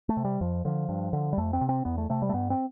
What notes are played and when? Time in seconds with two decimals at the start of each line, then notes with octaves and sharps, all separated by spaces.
0.09 A3
0.17 C3
0.25 G3
0.41 F2 F3
0.65 D3 F3
0.89 G2
1.13 D3
1.33 G3
1.38 F2 A3
1.53 C4
1.61 C3
1.69 C4
1.85 E2 B3
1.98 A3
2.09 C3 A3
2.22 G3
2.29 A3
2.34 G2 B3
2.50 C4